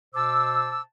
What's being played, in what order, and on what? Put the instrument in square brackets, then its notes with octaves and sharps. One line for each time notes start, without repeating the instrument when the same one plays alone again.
[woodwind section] B2 C5 A5 D6 E6